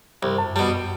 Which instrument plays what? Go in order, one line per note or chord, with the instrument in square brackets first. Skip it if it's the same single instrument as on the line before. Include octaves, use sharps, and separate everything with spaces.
[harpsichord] C2 [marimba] G2
[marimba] F#2
[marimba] F#2 [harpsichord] B2 G3